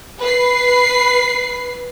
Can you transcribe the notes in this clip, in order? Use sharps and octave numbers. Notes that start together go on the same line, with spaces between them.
B4 C7